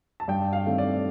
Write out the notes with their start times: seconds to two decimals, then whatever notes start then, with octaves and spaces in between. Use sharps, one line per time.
0.20 A5
0.28 G2 G5
0.53 F5
0.65 D#3 A3 C4
0.78 D5